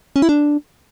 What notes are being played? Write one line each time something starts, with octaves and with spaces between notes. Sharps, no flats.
C#4
E4
D4